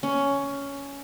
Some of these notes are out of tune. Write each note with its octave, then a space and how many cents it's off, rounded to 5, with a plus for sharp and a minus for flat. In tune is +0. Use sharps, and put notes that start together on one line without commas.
C#4 +10